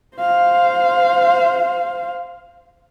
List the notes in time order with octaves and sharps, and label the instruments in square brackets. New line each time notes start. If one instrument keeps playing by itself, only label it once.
[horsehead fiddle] C5 F5